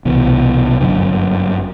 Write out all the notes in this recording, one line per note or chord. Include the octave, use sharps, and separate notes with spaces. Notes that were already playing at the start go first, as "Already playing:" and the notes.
C2 B2 E3
G1 F#2 D3